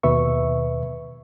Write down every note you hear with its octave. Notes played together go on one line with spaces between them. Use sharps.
D#2 B2 B4 E5 C#6